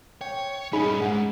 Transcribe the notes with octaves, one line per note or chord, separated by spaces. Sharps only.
C#5 G5
G2 C#4 D#4 G#4 B5
G#2 F#5